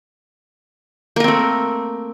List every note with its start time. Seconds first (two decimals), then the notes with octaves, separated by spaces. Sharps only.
1.16 A#3
1.20 A#4
1.24 C4
1.28 A3